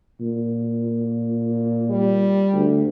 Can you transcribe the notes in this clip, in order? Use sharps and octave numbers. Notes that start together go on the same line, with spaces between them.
A#2
G3
D2